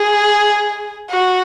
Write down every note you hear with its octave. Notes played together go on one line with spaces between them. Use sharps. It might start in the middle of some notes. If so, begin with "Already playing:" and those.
Already playing: G#4
F#4